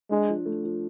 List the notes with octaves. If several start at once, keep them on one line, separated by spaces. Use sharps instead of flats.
G#3 D4
F3
A3
F3